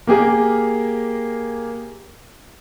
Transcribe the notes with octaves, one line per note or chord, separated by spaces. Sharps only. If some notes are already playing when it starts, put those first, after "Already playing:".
A#3 G4 G#4 A#4